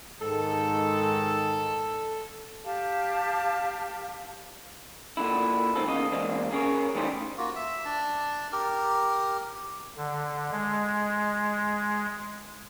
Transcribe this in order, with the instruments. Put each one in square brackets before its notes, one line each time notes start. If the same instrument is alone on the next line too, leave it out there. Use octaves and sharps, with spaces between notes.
[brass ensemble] G#2 D#3 [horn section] A4
[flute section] G4 F5 A5
[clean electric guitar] A#2 D3 E4
G#2 D#3 C4 A4
E2 C#3 A#3 D#5
E3 G#3 A#3 C4 D4
C#4 G#4 A#4 C#5
E3 G3 A3 D#4 G4 C5
[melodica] A#3 F4 F#4
E5
D4 A5
G4 A#4
[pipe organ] D3
G#3